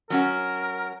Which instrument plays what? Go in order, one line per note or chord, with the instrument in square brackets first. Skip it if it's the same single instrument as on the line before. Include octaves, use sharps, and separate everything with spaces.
[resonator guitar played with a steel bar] F#3 C#4 F#4 [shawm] A#4